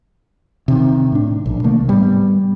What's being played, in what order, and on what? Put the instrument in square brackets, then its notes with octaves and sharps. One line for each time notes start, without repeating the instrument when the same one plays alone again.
[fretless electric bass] C3 D#3
A2 D4
A#1
C3 D#3 A3 A#3
G#2 G3 B3